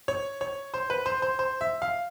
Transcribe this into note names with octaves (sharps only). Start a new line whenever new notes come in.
C#5
C#5
C5
B4
C5
C5
C5
E5
F5